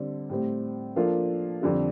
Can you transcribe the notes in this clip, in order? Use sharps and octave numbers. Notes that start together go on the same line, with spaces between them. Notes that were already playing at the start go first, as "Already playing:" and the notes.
Already playing: D3 G3 C4
A2 G3 C4
F3 A#3 D4 F4 A4
F2 D3 G3